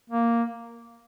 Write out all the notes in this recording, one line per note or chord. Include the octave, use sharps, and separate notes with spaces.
A#3